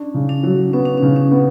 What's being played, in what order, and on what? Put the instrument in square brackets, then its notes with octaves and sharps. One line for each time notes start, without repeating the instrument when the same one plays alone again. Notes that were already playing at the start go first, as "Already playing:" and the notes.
Already playing: [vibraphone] C#4 [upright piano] D4
[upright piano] C#3
[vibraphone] D4
[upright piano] F#3
[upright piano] B3 [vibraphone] C#4
[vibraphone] D4
C#4
[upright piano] C#3
[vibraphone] C#4
[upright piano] B3